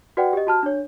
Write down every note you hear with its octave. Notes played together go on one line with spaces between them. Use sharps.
F#4 B4 D5 F#5 G5
G4 D#5
F#4 A5 F6
D4 C#5